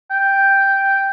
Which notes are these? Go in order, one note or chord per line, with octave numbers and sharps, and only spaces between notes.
G5